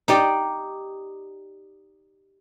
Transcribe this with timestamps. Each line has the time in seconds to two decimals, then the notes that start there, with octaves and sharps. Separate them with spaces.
0.08 D#4 G4 D5